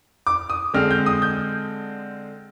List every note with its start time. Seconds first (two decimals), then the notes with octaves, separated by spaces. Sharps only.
0.27 D6
0.50 D#6
0.74 D3 G#3 C4 F6
0.91 G6
1.06 D#6
1.22 G6